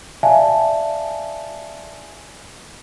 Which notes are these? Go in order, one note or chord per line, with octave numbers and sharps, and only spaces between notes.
D5 E5 F5 G#5 A5